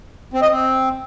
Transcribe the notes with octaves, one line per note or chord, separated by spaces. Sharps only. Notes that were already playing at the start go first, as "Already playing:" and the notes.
C4
D#5
C4